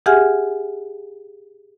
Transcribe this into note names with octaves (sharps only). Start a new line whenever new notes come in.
G4 G#4 E5 F#5 G#5 F6